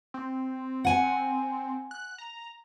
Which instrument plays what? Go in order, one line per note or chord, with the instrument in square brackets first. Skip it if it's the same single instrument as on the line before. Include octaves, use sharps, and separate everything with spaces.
[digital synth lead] C4
[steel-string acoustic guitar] F#5 G#5
[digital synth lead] F#6
A#5